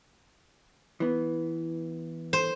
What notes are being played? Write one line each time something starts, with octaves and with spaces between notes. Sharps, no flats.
E3 B3
C5